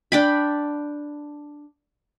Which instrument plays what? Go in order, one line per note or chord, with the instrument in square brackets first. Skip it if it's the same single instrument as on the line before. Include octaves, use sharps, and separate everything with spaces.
[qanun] D4 G5 B5